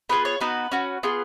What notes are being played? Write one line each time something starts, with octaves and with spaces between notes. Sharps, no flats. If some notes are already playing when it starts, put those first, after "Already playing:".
B3 F4 G#4 B4
C#5
B3 D#4 F#4 B4
C#4 F#4
B3 F4 G#4